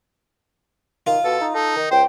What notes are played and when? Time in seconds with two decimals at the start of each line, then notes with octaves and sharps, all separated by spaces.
1.07 D#3 F4
1.24 B2 A4
1.41 D#4
1.54 D#4 A4
1.76 D#3
1.91 C#2 C5 G5